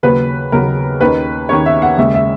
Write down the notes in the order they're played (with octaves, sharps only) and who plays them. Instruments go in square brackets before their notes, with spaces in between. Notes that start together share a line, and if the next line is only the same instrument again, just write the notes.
[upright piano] D#2 C#3 F#3 A#3 B4
D#2 C#3 F#3 A#3 A#4
D#2 D#3 A#3 C#4 B4
D#2 D#3 A#3 C#4 C#5
E5
F#5
D#2 C#3 G#3 C#4 E5
E5